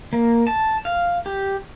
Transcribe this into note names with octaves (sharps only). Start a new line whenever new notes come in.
A#3
A5
F5
G4